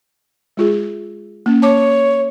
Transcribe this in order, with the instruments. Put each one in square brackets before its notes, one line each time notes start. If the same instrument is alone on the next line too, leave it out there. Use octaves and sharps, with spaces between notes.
[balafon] G#3 F4 G#4
A#3 C#4
[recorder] C#5 [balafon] A5 D6